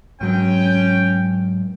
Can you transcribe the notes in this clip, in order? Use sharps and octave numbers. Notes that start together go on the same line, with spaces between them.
G#2 F#3 C#4 G5